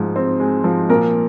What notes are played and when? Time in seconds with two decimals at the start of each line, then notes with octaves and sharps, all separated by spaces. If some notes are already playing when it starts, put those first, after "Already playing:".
Already playing: G#2 F3 G#3
0.16 C4
0.40 G#3
0.64 F3
0.89 A#2 A#4